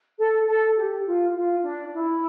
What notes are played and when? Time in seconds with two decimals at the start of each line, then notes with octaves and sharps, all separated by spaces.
0.17 A4
0.46 A4
0.76 G4
1.05 F4
1.34 F4
1.64 D4
1.93 E4